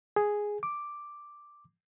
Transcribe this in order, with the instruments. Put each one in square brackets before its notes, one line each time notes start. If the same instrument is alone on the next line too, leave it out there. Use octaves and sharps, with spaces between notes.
[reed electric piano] G#4
D6